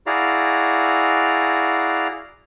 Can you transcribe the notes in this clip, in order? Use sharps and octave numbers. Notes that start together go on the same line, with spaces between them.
E4 F#4 G#4 D5 F5 A#5